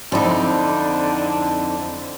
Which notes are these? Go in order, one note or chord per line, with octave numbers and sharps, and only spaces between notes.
F2 D3 C4 D#4 E4 D5 A5